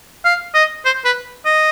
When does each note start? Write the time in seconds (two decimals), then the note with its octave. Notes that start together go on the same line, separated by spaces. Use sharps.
0.25 F5
0.54 D#5
0.85 C5
1.05 B4
1.45 D#5